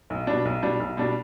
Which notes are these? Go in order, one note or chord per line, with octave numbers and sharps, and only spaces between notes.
B1
B2 G3 D4
B1
B2 G3 D4
B1
B2 G3 D4